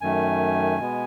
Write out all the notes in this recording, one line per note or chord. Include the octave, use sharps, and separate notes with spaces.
F#2 D#3 A3 G#5
B2 G#3 B3